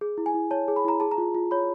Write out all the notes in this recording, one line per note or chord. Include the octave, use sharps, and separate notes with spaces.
G#4
E4
G#5
E4
C#5 A5
G#4
B5
E4 A#5
G#4 A5
A#5
F4
F4
C#5 B5